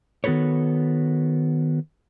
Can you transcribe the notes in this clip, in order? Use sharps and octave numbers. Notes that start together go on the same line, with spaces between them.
D#3 B3 F#4 A4 B4 C#5